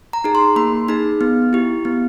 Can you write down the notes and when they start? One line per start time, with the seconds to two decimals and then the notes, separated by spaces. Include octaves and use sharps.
0.13 A#5
0.24 D#4 G#4
0.35 C6
0.56 A#3 B5
0.88 D#4 G#4 B5
1.21 B3
1.53 E4 G4
1.85 B3